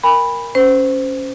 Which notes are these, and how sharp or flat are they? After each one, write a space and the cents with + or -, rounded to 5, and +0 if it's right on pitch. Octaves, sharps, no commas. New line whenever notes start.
A#4 +0 G#5 -40 B5 +0
C#4 +0 C5 -20